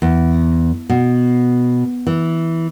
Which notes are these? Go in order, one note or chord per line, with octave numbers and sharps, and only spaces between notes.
E2
B2
E3